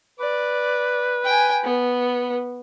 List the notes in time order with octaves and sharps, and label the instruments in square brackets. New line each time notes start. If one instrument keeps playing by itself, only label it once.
[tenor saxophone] B4 [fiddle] D5
[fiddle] G5 G#5
B3